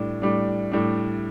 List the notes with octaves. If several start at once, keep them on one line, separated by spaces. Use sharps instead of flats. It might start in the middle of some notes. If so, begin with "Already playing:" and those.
Already playing: A2 G3 D4
A2 G3 D4
A2 G3 D4